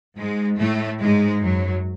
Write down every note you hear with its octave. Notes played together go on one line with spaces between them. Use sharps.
G#2 G#3
A2 A3
G#2 G#3
F#2 F#3